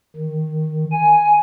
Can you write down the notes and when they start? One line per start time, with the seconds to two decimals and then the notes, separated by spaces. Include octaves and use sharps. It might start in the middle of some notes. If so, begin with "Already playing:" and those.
0.16 D#3
0.92 G#5